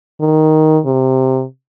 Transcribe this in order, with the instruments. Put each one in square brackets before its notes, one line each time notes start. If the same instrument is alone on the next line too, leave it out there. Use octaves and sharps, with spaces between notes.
[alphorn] D#3
C3